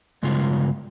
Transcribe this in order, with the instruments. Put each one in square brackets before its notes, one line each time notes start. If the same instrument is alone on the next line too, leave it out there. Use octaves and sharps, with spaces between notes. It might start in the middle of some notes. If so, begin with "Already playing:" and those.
[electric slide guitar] G2 C#3 G#3 B3 F4